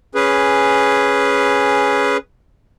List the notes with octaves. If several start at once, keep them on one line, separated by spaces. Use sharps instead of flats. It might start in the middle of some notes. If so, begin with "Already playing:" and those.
C#4 G#4 B4